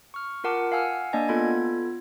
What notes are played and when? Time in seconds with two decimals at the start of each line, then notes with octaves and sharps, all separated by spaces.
0.14 C#6 F6
0.44 F4 A#4 F#5 A5 D6
0.72 F5 F#5 G#5 E6 F6
1.13 A#3 D4 D5 D#5 G#5
1.28 B3 F4 A4 B5 G#6